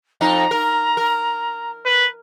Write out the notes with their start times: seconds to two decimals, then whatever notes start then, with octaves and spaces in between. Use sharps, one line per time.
0.21 F2 D#4 A#5
0.51 A#4
0.97 A#4
1.86 B4